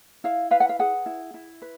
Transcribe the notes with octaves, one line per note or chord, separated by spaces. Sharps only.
E4 F5
B4 F5
F#5
F5
G#4 F#5
E4
E4
B4